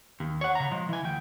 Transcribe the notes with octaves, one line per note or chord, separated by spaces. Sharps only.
D#2
C#5 F#5
C#3 A#5
F3 G#3
E3 G#5
D2 G5